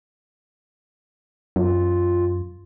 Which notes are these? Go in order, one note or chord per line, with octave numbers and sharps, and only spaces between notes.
F#2 F4